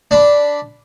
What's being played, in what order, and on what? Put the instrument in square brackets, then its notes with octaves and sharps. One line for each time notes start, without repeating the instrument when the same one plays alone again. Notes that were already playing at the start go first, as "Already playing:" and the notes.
[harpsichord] D4 B5